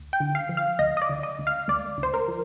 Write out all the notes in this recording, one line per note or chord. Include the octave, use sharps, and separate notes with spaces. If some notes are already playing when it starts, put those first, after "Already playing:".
Already playing: D2
G5
D3
F5
F3
F5
D2 D#5
D#5
D5
D2
D#5
D2
F5
D2 D5
D2
C5
A#4
F3